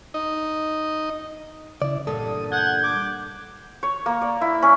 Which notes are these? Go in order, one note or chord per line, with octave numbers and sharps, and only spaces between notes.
D#4 D#5
C#3 E4 D5
E2 G2 A#2 A4 D#6
F#5 G6 G#6
D6
C#5
A#3
D5
E4
C#4